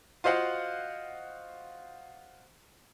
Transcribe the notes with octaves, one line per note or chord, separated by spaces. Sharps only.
F4 F#4 C5 D#5 F5 F#5